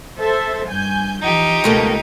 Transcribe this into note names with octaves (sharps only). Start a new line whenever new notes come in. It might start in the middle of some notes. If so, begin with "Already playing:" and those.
A4 C5 E5
G2 G#5 G6
E3 F3 D#4 G4
C#2 B2 A3 A#3